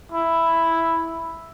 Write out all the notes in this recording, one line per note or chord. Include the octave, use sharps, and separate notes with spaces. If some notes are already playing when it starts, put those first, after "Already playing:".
E4